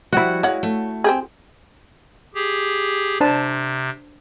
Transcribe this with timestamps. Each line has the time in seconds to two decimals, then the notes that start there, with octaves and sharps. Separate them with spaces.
0.13 F3 G3 E4 F#4 F#5
0.43 G#3 C#5 F5 F#5
0.63 A3
1.04 C4 G4 G#4
2.34 G4 G#4
3.21 C3 D4 C5 A5